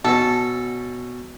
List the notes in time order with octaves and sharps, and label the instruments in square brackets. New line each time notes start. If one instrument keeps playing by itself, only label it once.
[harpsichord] B2 C#4 [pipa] A4